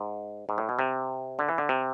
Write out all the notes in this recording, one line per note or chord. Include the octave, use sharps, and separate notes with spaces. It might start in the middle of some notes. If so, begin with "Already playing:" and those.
Already playing: G#2
G#2
A2
B2
C3
D3
E3
D3
C3